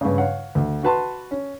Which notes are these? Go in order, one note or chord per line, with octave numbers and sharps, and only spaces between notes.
G2 C#3
C#5 F5 F#5
D2
F#4 B4 A5 C6
C#4